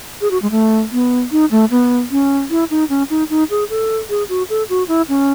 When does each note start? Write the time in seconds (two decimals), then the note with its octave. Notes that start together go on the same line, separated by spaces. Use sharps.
0.21 G#4
0.31 F#4
0.42 G#3
0.51 A3
0.92 B3
1.32 D#4
1.51 A3
1.70 B3
2.11 C#4
2.50 E4
2.71 D#4
2.90 C#4
3.10 D#4
3.30 D#4
3.50 G#4
3.70 A4
4.10 G#4
4.29 F#4
4.49 A4
4.69 F#4
4.88 E4
5.09 C#4